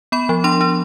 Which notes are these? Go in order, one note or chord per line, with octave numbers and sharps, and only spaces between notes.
B3 B5
F3
D4 C6
D4